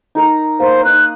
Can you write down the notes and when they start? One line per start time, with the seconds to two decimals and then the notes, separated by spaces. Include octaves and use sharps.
0.15 D#4 A#4 A#5
0.60 A#3 C5
0.85 D#4 D#6 F#6